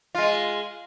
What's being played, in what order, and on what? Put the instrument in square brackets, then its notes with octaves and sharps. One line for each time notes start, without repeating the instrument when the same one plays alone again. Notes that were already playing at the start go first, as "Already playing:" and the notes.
[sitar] G#3 F4